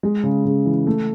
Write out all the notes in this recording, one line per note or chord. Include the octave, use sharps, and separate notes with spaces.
G#3
C#3
C#3
E3
A3